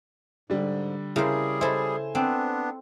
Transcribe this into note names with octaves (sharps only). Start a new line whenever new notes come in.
G#2 D3 G3
C#3 G3 E4 G#4 A#4 C5
E4 A4 C5 G#5
B3 C4 D4